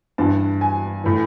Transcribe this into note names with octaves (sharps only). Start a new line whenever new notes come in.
G2 E3 A5
G#5
A2 E3